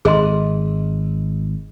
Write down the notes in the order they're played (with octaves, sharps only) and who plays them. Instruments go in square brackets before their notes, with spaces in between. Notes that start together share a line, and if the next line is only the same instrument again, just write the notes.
[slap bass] G#1 [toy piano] G#4 D#5 C6